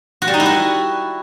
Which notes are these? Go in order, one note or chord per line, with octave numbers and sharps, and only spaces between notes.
F#4
G3
D#4
E4
F#4